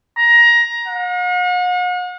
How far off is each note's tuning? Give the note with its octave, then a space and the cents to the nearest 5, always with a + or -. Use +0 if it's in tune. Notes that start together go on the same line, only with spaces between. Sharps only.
A#5 +20
F#5 -45